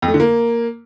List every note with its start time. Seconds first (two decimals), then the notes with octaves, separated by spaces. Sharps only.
0.02 F2
0.08 A3
0.14 D3
0.20 A#3